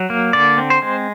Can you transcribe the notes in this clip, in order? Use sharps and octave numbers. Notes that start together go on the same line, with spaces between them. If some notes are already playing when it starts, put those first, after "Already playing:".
Already playing: F#3
A#3
D3 D5
C4
C5
G#3